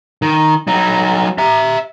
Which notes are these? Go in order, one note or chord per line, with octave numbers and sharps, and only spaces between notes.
D#3
F#3 D#4
E5 A#5